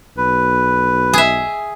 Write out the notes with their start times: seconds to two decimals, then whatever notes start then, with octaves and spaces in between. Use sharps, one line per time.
0.17 B1 B4
1.13 G#4 E5